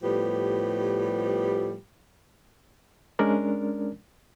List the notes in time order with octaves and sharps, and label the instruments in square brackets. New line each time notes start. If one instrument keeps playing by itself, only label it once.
[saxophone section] A2 F3 G3 B3 G4
[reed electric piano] G#3 C#4 D4 A#4 D5